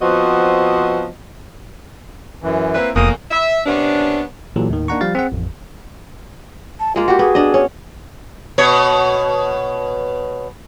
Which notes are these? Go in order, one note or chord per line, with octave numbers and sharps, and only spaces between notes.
F3 B3 C4 F#4 D#5
F#2 E3
A#3 C4 E4 B4
F1 E2 A2 A#3 D#6
E5
C3 B3 C#4 D4
A#2 E3 F#3 G4 A4
D#2 A2 D#3
A#3 D4 D#4 F#5 A#5 C#6
F3 G3 F5 A6
C4 G#4 F#5
A1 F2
A5
G#3 A#3 F4
F#4 G4
B3 G#4
D4 D#5
C#4
B2 C#5